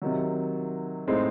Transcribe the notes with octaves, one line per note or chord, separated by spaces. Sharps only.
C3 D#3 F#3
A2 G#3 C4 D#4